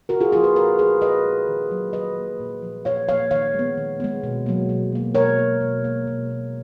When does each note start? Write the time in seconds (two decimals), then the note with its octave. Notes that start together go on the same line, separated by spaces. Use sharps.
0.09 C#3 F#4 A#4
0.21 F4 G#4
0.32 F3 A#3 F4 G#4
0.44 G#4 B4
0.55 A#2 F#4 A#4
0.78 G#3 B3 G#4 B4
1.01 A#2 B4 D#5
1.25 G#3 B3
1.48 D#3
1.71 F#3 A#3
1.93 D#3 B4 D#5
2.17 F#3 A#3
2.40 A#2
2.62 F3 A#3
2.85 A#2 C#5 F5
3.08 F3 A#3 C#5 F5
3.31 D#3 C#5 F5
3.54 G#3
3.59 B3
3.78 D#3
4.00 G#3 B3
4.23 B2
4.46 F#3 A#3
4.69 B2
4.92 F#3 A#3
5.15 B2 A#4 C#5
5.39 A#3
5.61 B2
5.84 A#3
6.07 B2
6.30 A#3